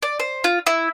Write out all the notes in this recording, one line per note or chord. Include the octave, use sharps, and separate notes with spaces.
D5
C5
F4
E4